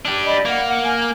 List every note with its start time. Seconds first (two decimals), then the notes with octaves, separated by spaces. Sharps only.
0.05 D4 G4
0.25 D5 D#5 B5
0.45 A#3 F#5
0.67 F#5
0.83 G#5 F6